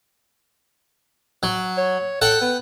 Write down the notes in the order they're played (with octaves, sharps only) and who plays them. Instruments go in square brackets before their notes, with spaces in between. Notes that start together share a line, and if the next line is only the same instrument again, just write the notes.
[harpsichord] F#3
[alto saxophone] C#5
[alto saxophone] A4 [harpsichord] F#5 G5
[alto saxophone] B3